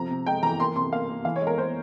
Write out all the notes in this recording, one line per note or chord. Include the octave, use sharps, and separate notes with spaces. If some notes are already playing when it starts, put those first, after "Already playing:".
Already playing: C3 F3 A#5
C3
G#3 G5
E3 A#5
A#3 C6
C3 C6
A#3 F5
A#3
E3 F5
C#5
G#3
A#4
E3 C5